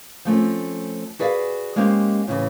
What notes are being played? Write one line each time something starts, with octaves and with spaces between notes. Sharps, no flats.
F3 A3 C4 C#4
F#4 G#4 B4 D5 E5 F5
G#3 A#3 C#4 G4 C5 F5
A2 C#3 E3